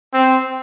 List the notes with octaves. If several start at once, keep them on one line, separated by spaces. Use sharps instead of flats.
C4